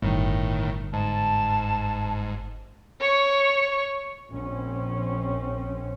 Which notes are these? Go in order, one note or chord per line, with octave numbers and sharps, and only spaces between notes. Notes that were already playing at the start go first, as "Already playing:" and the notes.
G1 A2 D#3
G#2 A5
C#5 C#6
A#1 C4 C#4